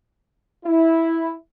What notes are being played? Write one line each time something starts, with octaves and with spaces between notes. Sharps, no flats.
E4